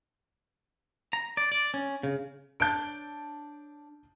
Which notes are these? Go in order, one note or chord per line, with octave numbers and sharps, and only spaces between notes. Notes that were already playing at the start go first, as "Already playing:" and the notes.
A#5
D5
D5
C#4
C#3
D4 C#5 A5 G6 A6 D7